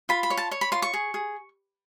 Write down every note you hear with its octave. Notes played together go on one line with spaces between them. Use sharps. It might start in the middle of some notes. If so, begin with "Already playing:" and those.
F4 B5
B5
C#5
A5
C#5
B5
F4 C6
C#6
G#4
G#4